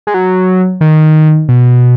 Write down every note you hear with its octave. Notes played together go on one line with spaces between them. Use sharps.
G#3
F#3
D#3
B2